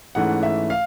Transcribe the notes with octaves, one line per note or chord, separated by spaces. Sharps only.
G#2 E3 A3 C#4 F#5
E5
F5